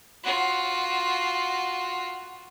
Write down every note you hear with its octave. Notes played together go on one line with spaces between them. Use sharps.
F4 F#4